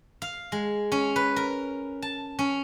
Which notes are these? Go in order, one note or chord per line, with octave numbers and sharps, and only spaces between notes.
F5
G#3
C#4
B4
A#4
A5
C#4